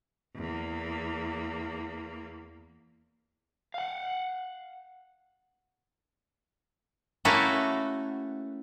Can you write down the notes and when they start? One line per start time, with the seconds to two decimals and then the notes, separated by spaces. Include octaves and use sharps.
0.36 E2 A#3
3.74 F5 F#5
7.25 A3 A#3 C#4 E4 F#4